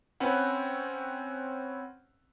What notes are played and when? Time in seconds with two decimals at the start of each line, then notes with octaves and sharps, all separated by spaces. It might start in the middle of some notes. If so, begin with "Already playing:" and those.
0.20 C4 C#4 B4 F#5